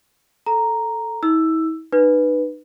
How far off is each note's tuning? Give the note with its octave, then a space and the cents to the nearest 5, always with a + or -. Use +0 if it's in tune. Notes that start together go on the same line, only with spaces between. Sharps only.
A4 +0 A#5 +0
E4 -45 E6 +10
D#4 -40 B4 +0